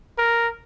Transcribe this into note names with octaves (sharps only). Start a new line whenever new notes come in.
A#4